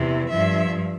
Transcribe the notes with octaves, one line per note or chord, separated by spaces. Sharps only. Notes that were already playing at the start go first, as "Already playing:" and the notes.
Already playing: E2 C3 E3
G2 F3 E5